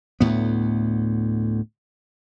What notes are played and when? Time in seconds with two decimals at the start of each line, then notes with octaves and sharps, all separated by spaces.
0.20 D2 A2 B3